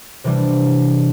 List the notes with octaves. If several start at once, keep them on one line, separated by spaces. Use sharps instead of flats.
C3 E3 G3 D4